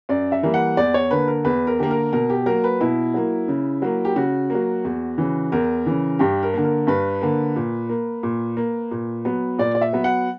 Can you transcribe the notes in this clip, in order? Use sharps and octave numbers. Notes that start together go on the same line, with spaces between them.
F#2 D5
E5
E3 G3 A#3
F#5
E2 D5
C#5
D3 A#3 B4
A#4
E2 B4
A#4
D3 A#3 G4
A#4
B2 A#4
G4
F#3 A#3 A#4
B4
B2 E4
F#3 A#3
C#3
F#3 A#3
G4
C#3 F#4
F#3 A#3
E2
C#3 E3
E2 A#4
C#3 E3
G2 G4
A#4
D3 A#3
A#4
G2 B4
D3 A#3
A#2
A#3
A#2
A#3
A#2
F#3 B3
A#2 D5
D5
E5
F#3 B3
F#5